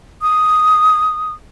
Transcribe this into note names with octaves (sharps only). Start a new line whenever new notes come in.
D#6